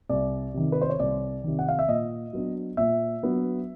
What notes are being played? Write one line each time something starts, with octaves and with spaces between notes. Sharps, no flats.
C2 D5
C3 D#3
B4
C5
C#5
C2 D5
C3 D#3
F#5
F5
E5
A#2 D#5
F#3 B3 D4
A#2 E5
F#3 B3 D4